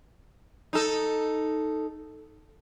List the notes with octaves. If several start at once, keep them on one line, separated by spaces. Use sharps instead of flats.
D#4 A4